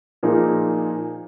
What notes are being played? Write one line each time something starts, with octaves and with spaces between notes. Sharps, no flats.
A#2 F3 A#3 D#4 G#4